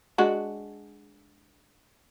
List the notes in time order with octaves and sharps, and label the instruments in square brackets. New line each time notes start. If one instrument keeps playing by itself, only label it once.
[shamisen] G#3 D4 F#4